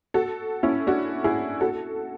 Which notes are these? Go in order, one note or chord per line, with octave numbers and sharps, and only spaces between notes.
F#4 A4
C#4 E4
D4 F#4
E4 G#4
F#4 A4